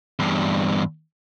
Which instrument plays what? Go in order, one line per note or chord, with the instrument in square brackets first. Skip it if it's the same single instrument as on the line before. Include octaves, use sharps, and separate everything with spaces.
[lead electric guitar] E2 G2